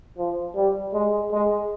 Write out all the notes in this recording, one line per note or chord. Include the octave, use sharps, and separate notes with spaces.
F3
G3
G#3
G#3